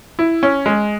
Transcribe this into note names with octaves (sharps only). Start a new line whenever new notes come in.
E4
C#4
G#3